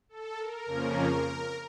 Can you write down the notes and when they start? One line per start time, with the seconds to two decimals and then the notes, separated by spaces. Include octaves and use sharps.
0.09 A4
0.38 A#4
0.66 F2 C#3 F3 A#3 C#4